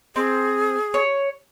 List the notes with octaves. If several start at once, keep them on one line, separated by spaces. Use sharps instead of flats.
C4 G#4
C#5